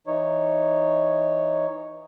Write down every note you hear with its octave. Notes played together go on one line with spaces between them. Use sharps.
E3 D#4 C#5